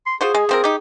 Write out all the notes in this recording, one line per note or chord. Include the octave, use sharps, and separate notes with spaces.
C6
F4 F#4 G#4 C5
G#3
F3 C4 A#4
D#4 G4